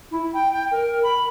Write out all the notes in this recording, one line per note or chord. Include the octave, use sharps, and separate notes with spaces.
E4
G5
G5
A#4
B5